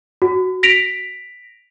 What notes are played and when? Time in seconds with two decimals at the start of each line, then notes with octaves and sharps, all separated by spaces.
0.22 F#4
0.63 A#6 B6 D7 F7